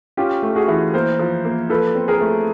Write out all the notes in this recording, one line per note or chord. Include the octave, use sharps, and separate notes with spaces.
C#4 F4 G4
A3
F#4 G#4
E3
A#3 A#4 C5
F3
A#3
F3 A4 B4
C4
G#4 A#4
A3